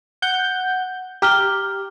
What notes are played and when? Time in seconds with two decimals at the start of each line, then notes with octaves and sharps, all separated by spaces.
0.22 F#5 G6
1.22 G4 A#5 F6 G7